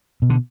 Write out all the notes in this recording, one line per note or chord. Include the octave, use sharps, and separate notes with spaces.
B2
D3